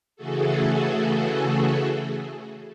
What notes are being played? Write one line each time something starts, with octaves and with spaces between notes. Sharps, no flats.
C#3 E3 A3 F#4 G#4 A4